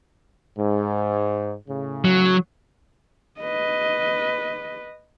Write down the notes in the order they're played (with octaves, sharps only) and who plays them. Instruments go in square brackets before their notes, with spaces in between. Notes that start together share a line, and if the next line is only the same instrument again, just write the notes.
[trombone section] G#2
A2 C#3
[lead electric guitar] F#3
[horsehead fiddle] B4 D#5